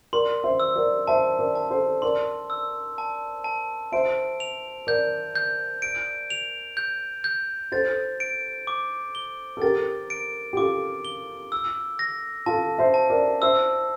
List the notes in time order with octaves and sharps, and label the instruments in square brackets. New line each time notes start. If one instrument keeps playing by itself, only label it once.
[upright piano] A#4 D5 [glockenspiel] C6
[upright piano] C5 E5
[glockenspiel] E6
[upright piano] A#4 D5
[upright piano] C5 E5 [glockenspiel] A5
[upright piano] A#4 D5
[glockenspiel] A5
[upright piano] A4 C5
[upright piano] A#4 D5 [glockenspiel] C6
[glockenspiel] E6
A5
A5
[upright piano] C5 E5 [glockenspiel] D7
[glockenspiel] F7
[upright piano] A#4 D5 [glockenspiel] G6
[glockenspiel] G6
D7
F7
G6
G6
[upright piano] A4 C5 [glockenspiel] A6
[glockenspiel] D7
D6
G7
[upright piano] A4
[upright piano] G4 A#4 [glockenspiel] A6
[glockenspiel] D7
[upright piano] G4
[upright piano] F4 A4 [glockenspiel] D6
[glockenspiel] G7
E6
A#6
[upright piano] F4 A4 [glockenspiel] A5
[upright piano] C5 E5
[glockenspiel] A5
[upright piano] A#4 D5
[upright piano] C5 E5 [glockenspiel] E6